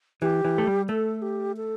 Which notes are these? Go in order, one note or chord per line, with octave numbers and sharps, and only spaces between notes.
E3 G4
E3
A3
G3
A3 A4
G4
A4